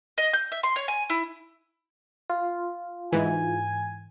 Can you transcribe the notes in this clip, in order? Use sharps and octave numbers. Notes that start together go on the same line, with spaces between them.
D#5
G6
E5
C6
C#5
G#5
E4
F4
G#2 E3 G#5